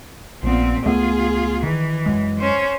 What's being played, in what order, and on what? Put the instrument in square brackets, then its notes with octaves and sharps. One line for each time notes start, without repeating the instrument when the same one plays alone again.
[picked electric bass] A#1 B3 [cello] A#2 C4
[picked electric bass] C#2 A3 B3 [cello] F4 G#4
[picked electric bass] D#3 [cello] E3
[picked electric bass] F#2 G#3
[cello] C#4 C5